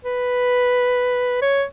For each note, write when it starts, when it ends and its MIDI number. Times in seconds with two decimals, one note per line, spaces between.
0.05 1.38 71
1.42 1.64 73